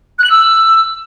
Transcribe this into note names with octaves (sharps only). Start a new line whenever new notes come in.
F#6
F#7
E6